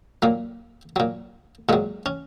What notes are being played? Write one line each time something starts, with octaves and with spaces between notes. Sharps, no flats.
A#2 F#3 A#3
A#2 F#3
A#2 F#3 G#3
C#4